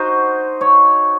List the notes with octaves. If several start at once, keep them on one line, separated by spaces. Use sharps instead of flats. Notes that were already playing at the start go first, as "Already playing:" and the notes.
Already playing: D#4 F#4 C5
C#5